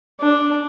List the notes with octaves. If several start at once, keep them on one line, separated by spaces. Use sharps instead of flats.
D4